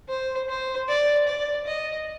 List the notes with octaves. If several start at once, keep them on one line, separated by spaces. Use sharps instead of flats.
C5
C5
D5
D5
D#5